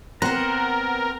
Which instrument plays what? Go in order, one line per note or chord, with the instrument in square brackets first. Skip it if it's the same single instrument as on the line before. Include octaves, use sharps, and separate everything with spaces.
[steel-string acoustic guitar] B3 C5 [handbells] C4 F#6 [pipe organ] A#4 [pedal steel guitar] F#5 A#5